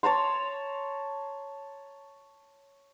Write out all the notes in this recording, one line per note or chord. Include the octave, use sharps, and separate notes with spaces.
C#5 A5 A#5 C6